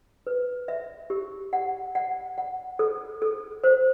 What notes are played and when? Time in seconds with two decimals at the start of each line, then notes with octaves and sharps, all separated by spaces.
0.27 B4
0.68 E5
1.10 G4
1.53 F#5
1.95 F#5
2.38 F#5
2.79 A4
3.22 A4
3.64 C5